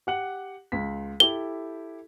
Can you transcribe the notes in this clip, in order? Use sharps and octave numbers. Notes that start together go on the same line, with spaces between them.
G4 F#5 F#7
C#2 B6
E4 G4 A4 G7